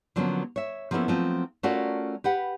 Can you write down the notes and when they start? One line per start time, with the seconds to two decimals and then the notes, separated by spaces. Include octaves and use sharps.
0.16 D3 F3 F#3 A#3 B3 C#4
0.56 C#5 E5
0.91 F3 A#3 B3 C#4 E4 A4
1.08 F3 F#3 A3 B3 C4 F4
1.63 A3 C#4 F4 F#4 A#4 D5
2.24 G4 B4 F#5